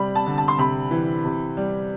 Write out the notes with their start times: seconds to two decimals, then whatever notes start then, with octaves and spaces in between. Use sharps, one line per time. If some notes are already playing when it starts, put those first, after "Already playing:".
Already playing: C3 G3 B5
0.15 A5
0.26 D3
0.38 A5
0.48 C6
0.58 C3 B5
0.91 E3
1.25 C3
1.57 G3